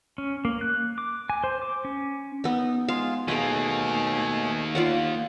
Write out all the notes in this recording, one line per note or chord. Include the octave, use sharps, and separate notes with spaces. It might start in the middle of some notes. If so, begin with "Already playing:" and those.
C#4
A#3
F#6
D6
G#5
C5
D6
C#4
B3 D#4
G#3 F4 G#4 F5
B2 D#3 A3 A#3 G#4 B4 G#5
F4 D5 F#5